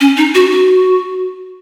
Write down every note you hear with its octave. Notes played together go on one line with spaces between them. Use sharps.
C#4
D#4
F#4
F#4